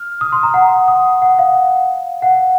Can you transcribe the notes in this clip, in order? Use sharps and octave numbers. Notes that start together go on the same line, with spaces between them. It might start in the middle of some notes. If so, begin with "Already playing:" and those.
Already playing: F6
D#6
C6
A#5
F#5
D#6
F#5
F5
F#5